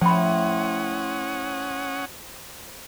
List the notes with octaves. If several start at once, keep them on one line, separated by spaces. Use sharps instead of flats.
A2 F3 C#4 C5 F#5 G5 B5 D#6